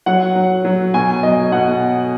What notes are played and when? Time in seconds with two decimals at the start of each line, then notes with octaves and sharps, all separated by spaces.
0.06 F#3 F#5
0.35 F#3
0.65 F#3
0.94 B2 G#5
1.23 F#3 D#5
1.52 B2 F#5